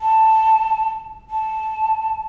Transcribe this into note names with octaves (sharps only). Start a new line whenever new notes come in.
A5
A5